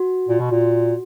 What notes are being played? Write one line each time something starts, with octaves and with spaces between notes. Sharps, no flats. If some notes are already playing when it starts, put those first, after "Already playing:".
Already playing: F#4
A#2
B2
A#2